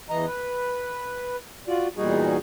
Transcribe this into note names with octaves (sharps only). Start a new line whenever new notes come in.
E2 E3 D#5 A#5
B4
F4 F#4 D5
E2 A#2 G3 D#4 F#4 G#4